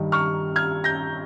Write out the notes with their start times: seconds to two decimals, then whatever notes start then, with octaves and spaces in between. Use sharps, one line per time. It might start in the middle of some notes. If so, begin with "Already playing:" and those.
Already playing: G2 D#3 G3
0.12 C#6 F6
0.56 F6 G#6
0.84 G6 A#6